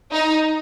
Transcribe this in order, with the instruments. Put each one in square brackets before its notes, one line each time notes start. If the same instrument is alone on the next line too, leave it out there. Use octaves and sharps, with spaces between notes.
[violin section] D#4